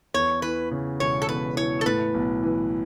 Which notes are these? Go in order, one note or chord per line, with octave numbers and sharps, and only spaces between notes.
E2 C#5
E3 B4
C#3
E1 C#5
A4
E2 B4
E3 C#5
A4
A2 B4
B1
E3